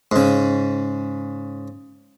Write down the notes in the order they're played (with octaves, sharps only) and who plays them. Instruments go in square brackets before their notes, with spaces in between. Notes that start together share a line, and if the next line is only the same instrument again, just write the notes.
[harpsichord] G#2 C#3